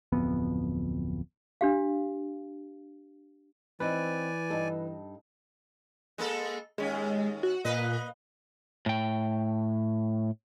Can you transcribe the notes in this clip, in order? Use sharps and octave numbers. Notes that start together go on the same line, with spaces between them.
D1 F2 B3
D4 G4 F5
E3 C4 D#4 B4 D5 E5 G#5
G2 D#4 A4
G#3 A#3 A4
D#2 G#3 C#4
F#4
A#2 A#3 B4 D#5
A2 G5